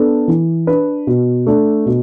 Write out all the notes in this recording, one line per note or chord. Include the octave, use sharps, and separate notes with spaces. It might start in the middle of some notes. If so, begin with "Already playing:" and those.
Already playing: B3 D4 A4
E3
D4 B4
B2
A3 D4
B2